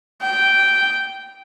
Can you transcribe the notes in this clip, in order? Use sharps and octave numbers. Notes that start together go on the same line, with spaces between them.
G5